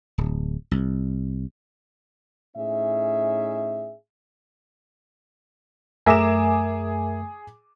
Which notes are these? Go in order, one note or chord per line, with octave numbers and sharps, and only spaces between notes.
D1
C2
A2 C#4 D#4 G#4 E5
F#2 A3 G#4 A#4 E5 A#5 D6 E7